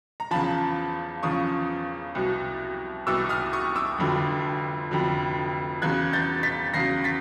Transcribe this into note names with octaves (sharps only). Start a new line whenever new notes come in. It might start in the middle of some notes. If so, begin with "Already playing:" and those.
A#5
E2 C#3 F3 A5 B5
E2 C#3 F3 C#6 D#6
C2 B2 F#3
C2 B2 F#3 D6 E6
D#6 F6
C#6 D#6
D6 E6
F1 F2 D3 F#3
F1 F2 D3 F#3
E2 C#3 F#3 F#6 G#6
G6 A6
A6 B6
E2 C#3 F#3 A#6 C7
A6 B6